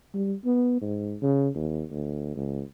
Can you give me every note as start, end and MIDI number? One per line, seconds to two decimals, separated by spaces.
0.14 0.34 55
0.45 0.78 59
0.82 1.17 44
1.22 1.49 49
1.56 1.84 39
1.91 2.36 38
2.36 2.62 37